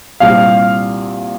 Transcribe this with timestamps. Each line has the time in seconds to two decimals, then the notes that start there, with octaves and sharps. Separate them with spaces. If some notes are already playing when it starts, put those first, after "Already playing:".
0.20 C2 A#2 G3 F5